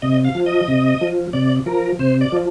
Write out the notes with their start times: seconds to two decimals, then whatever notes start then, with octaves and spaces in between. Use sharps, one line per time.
0.02 C3 D#5
0.24 F5
0.35 F3
0.46 D#5
0.68 C3
1.01 F3
1.33 C3 D5
1.66 F3 A#4
1.99 C3 C5
2.21 D5
2.32 F3